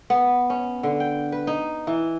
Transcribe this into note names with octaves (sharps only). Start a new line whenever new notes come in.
B3
C#4
D3
G5
B4
D#4
E3